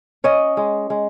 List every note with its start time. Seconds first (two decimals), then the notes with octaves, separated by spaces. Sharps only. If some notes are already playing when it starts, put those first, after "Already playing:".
0.24 C#4 C#5 D#5
0.57 G#3
0.90 G#3